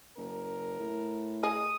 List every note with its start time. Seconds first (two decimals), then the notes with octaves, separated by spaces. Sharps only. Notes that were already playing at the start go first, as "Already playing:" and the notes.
0.17 F#1 A#4
0.80 A2
1.43 G#4 D#5 D#6